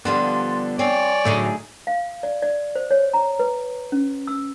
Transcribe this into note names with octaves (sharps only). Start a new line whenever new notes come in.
D3 F3 G3 B3 D4 C6
C4 C#5 D5 G#5
A2 D3 F#3 A3 D#4 G#4
F5
D5
D5
C5
C#5
A#5
B4
C#4
E6